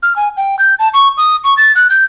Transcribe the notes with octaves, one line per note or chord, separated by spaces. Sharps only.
F6
G#5
G5
G6
A5
C#6
D#6
C#6
A6
F#6
G6